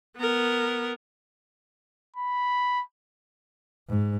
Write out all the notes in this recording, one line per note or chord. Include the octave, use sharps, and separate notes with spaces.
B3 A#4
B5
G#2